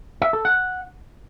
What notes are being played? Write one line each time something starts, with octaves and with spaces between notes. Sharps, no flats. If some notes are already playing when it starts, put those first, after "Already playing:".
E5
A4
F#5